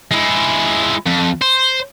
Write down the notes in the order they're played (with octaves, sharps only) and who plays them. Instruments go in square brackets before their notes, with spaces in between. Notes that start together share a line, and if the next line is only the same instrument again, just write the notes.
[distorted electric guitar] G#3 E4
F2
C5